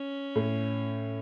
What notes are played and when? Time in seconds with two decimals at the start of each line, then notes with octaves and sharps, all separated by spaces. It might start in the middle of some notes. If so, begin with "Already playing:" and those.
Already playing: C#4
0.35 A2